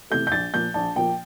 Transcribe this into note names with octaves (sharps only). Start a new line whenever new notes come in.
C3 E3 A3 G6
G6
A#1 A6
A#2 F3 A#3 G6
A#1 A5
A#2 F3 A#3 G5